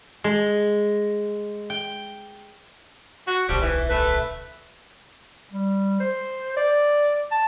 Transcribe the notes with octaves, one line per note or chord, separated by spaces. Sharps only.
G#3
G5
F#4
D1 B1 F3 G3 G4
E3
A3 B4
G3
C5
D5
A5